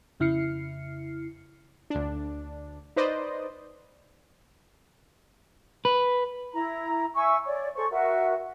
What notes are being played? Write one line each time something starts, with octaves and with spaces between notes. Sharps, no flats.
F2 C#3 E4 F6 C7 C#7
D2 D4
D#4 B4 C5 D5 D#5
B4
E4 A#5
E5 G#5 C#6 E6
C#5 D5
G#4 A4 C5 C#6
F#4 A#4 E5